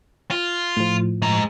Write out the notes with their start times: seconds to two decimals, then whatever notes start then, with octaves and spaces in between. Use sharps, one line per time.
0.31 F4
0.76 A2 F3
1.22 G#3 A#5